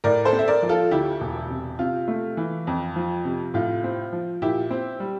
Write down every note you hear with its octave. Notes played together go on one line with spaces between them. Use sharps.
A2 A#4 D5
A4 C5
C4
E5
A#4 D5
F3
F4 A4
D2 E4 G4
E1
C3
C3 F4
A3
E3
F2
F3
C3
A2 F4
C4
F3
A#2 E4 G4
C4
G3